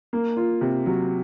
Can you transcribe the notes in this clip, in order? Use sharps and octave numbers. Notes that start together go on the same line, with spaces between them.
A#3
F4
C3
F#3